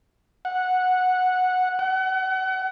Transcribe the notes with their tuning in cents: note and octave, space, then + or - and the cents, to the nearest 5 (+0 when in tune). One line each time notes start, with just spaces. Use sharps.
F#5 -10
F#5 +35